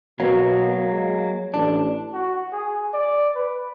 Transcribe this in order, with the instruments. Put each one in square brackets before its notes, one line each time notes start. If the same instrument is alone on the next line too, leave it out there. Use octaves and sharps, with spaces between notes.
[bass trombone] B2 [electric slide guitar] F#3 A#3
[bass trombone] G#3
[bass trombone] A1 [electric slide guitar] D4
[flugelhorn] F#4
G#4
D5
B4